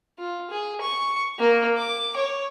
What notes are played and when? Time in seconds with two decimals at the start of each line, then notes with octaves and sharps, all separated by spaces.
0.19 F4
0.51 G#4
0.81 C#6
1.39 A#3
1.77 D6
2.17 C#5